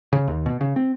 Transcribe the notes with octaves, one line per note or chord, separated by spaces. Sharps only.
C#3
D#2
B2
C#3
C4